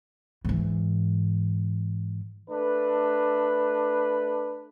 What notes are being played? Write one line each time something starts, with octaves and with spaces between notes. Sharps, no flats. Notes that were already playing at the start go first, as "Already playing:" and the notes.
G#2 E3
A3 D4 B4